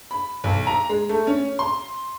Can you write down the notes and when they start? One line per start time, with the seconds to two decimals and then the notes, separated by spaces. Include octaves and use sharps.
0.11 B5
0.44 B1
0.67 A#5
0.89 G#3
1.09 A3
1.27 C#4
1.59 C6